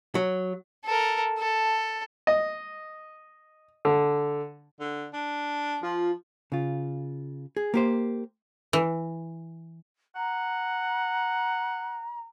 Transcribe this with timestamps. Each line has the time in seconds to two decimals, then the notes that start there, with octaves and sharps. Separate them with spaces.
0.15 F#3
0.85 A4 A#4
1.39 A4
2.27 D#5
3.85 D3
4.80 D3
5.13 D4
5.83 F3 F4
6.52 C#3 F4
7.57 G#4
7.74 A#3 G4 C5
8.73 E3
10.16 F#5 A#5